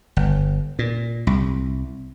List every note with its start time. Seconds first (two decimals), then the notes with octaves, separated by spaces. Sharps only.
0.17 G1
0.79 A#2
1.27 C2